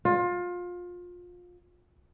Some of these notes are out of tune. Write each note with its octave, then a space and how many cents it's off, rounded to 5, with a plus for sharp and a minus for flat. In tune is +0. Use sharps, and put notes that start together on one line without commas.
F4 +25